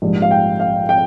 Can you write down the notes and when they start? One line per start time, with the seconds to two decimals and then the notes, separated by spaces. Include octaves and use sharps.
0.02 A#1 G#2 G3
0.22 F5
0.31 G5
0.60 F5
0.89 G5